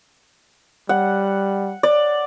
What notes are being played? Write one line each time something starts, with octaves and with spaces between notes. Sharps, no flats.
G3 F#5
D5